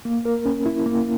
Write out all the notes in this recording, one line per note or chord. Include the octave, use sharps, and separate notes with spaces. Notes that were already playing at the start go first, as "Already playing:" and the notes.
A#3
A#4
C#4
E4
A#3